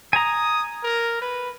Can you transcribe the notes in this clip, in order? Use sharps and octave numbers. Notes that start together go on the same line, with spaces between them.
G#5 A#5 D#6
A#4
B4